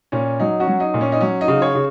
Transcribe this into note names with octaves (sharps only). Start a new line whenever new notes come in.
A#2 C#4
F#3 D#4
C#4 F#4
F#3
D#4
A#2
C#4
D#4
F#3 C#4
D#4
C#3
G#4 C#5
C#3